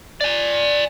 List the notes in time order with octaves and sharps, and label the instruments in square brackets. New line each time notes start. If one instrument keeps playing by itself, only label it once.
[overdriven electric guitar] D5 G#5